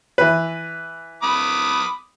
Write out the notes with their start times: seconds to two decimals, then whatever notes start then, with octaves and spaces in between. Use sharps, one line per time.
0.18 E3 B4
1.23 B5 D6 D#6